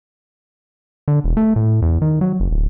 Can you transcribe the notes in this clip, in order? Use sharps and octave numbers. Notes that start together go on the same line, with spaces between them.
D3
E1
A3
A2
E2
D#3
F#3
F#1
D1